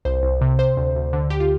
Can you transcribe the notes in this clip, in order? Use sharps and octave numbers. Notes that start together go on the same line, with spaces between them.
C2 C5
C2
C3
C3 C5
D2
D2
D3
D3 G4
F4